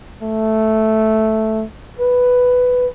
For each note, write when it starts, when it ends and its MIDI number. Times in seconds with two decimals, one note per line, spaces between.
0.23 1.64 57
1.99 2.87 71